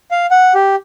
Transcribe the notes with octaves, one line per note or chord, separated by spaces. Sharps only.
F5
F#5
G4